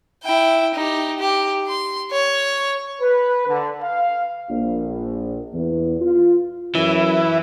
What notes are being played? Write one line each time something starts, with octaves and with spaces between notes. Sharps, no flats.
E4 G5
D#4 G4
G4
C6
C#5
B4
D3
F5
A#1
E2
F4
F#2 E3 E4